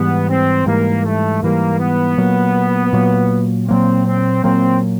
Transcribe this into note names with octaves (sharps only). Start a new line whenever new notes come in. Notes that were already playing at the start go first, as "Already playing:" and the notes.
Already playing: G#2 E3 G3 B3
C4
G#2 E3 G3 A#3
A3
G#2 E3 G3 A#3
B3
A#2 F#3 A#3
A#2 F#3 A#3
A#2 F#3 A#3 C4
C4
A#2 F#3 A#3 C4